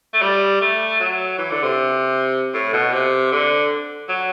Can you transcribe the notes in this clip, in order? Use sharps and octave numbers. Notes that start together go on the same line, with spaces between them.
A3
G3
A3
F#3
E3
D3
C3
A2
B2
C3
D3
F#3